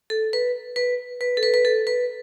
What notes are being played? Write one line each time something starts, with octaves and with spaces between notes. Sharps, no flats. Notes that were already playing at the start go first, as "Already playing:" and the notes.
A4
B4
B4
B4
A4
B4
B4
A4
B4